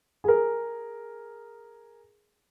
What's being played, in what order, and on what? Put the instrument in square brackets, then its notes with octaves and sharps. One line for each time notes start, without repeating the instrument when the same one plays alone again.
[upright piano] G#4 A#4